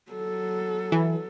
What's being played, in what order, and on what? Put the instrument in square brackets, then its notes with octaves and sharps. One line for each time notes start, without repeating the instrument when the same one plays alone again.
[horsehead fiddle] F#3 A4
[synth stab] E3